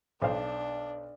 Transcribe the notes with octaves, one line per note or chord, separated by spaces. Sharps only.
B1 D4 C5 F5